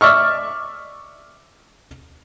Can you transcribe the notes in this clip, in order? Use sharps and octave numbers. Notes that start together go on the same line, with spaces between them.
D5 E5 C#6 F6